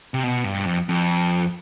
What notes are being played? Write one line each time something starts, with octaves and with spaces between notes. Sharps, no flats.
C3
B2
G2
F2
F2